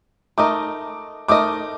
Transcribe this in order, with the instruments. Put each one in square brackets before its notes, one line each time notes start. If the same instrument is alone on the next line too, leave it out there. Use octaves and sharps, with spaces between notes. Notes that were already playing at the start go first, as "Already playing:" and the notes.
[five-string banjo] A3 D#4 A#4 D#5 [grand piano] D6
[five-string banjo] A3 D#4 A#4 D#5 [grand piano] D6